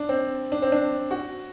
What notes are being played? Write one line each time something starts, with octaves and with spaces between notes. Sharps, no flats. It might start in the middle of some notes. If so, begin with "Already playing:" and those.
Already playing: D4
C4
D4
C4
D4
F#4